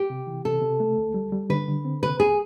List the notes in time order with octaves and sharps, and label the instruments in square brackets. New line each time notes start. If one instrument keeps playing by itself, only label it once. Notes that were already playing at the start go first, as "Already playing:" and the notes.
Already playing: [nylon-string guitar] G4
[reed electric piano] C3
E3
[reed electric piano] C3 [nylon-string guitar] A4
[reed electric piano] C3
A3
D2
G3
G3
[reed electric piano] D3 [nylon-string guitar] B4
[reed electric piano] D3
C4
[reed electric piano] C3 [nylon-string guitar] B4
[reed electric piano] C#2 [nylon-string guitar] G#4